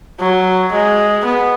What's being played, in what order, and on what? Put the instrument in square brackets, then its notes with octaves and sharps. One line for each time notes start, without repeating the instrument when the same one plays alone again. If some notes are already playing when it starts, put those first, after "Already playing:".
[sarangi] F#3
G#3
B3